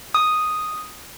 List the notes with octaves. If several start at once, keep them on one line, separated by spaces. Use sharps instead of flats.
D#6